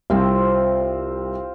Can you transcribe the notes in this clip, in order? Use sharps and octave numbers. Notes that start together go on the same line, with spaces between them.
C2 C4 F4 C5